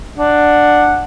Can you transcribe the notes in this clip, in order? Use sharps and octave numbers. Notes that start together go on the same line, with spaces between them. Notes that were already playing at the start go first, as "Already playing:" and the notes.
D4 F#5